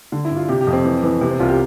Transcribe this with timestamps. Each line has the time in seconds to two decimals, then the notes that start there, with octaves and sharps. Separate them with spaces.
0.12 D3
0.25 E4
0.31 G2
0.36 F4
0.48 C3 G4
0.61 G4
0.67 F2
0.73 C4
0.85 E3
1.03 E3
1.21 C3 B3
1.31 C4
1.40 C2 F4
1.48 G4